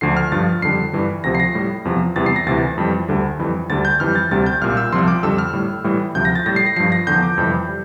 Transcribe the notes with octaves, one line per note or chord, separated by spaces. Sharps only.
D2 D3 F3 C7
F6
G2 F3 A6
F2 D3 G3 C7
G2 E3 G3
D2 C3 F3 A#6
C7
A#6
A2 G3
E2 C3 F3
E2 C3 E3 G3 A6
C7
A#6
D2 C3 E3 A6
F2 E3 G3
D2 D3 G3
F2 E3 G3
D2 D3 G3 A6
G6
F2 E3 G3 F6
A6
D2 C3 G3 A6
G6
C2 A#2 G3 F6
E6
C2 C3 F3 C6
D6
F2 D3 G3 E6
F6
A2 G3
A2 E3 G3
D2 C3 F3 G6
A#6
A6
A2 G3 A#6
C7
A#6
G2 F3 C7
A#6
E2 D3 F3 G6
D6
F2 C3 E3 G3
G3